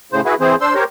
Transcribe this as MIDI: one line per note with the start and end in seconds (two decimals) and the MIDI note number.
0.12 0.21 45
0.12 0.21 49
0.12 0.21 72
0.25 0.35 64
0.25 0.35 66
0.25 0.35 68
0.25 0.35 71
0.40 0.55 52
0.40 0.55 60
0.40 0.55 68
0.40 0.55 72
0.61 0.74 62
0.61 0.74 72
0.61 0.74 84
0.61 0.74 88
0.75 0.84 67
0.75 0.84 70
0.75 0.84 72
0.75 0.84 73